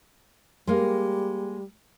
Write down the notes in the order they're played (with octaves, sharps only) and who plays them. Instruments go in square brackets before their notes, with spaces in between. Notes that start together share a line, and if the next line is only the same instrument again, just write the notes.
[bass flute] G3 [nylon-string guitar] G#3 A#3